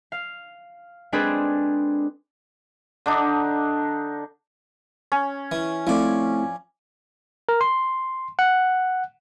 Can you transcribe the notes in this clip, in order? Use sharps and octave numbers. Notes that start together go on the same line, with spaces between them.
F5
G#3 C4 D4 G#4 A4 B4
D3 D4 D#4
C#4
E3
F3 A3 C4 E4 D5
A#4
C6
F#5